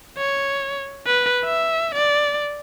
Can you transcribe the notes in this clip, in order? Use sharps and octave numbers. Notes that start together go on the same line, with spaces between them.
C#5
B4
E5
D5